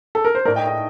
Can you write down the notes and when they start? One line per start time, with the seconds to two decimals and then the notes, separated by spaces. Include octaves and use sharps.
0.15 A4
0.25 A#4
0.35 C5
0.45 A2 A3 A#4 D5
0.55 D#5 G5
0.67 D#5 G5